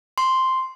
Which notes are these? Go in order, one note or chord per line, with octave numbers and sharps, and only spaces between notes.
C6